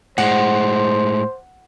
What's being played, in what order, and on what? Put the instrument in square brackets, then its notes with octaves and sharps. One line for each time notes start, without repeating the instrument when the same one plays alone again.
[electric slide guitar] A2 G#3 [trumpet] C5 [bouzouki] F#5